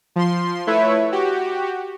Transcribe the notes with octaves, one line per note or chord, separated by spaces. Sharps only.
F3 C6
A3 E4 B4 C#5 E5
F#4 G4